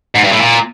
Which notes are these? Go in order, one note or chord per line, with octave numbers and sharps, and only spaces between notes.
G#2
G2
A2
A#2